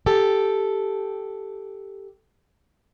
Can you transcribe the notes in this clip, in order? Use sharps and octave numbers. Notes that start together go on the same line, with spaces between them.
G4 A4